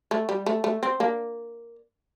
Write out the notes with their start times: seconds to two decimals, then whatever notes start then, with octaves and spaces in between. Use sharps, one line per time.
0.11 A3
0.29 G3
0.46 A3
0.64 A3
0.83 C4
1.00 A#3 D4